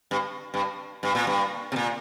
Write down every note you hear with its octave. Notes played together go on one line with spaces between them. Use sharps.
G2
G2
G2
A#2
G2
C3
A#2